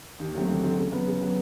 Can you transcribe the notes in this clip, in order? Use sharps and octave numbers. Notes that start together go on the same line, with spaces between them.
D#2
D3 F#3 A3 C4
D#2
D3 F#3 A3 C4
C#3
F#3 B3
C#3
F#3 B3